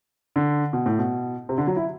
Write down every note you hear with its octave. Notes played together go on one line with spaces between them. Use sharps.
D3
B2
A2
B2
C3
D3
F#3
E4